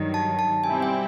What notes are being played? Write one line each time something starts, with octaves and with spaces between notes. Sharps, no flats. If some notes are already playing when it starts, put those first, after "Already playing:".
Already playing: G2 D#3 F#3
A5
A5
B2 G3 C4 E4 G#5
G5